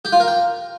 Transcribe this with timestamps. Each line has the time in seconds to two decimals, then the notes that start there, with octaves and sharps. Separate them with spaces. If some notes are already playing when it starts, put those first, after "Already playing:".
0.05 G4
0.12 F4
0.20 A#4
0.28 G5